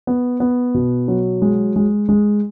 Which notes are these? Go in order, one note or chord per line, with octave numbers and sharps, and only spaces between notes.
B3
B3
B2
F#3
G#3
G#3
G#3